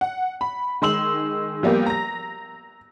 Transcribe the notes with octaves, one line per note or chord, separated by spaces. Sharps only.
F#5
B5
D#3 G#3 C6 E6 F#7
F3 G3 A#3 B3 G4
A#5 A#6